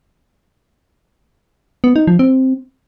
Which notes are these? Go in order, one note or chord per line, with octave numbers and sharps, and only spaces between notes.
B3
D#4
F3
C4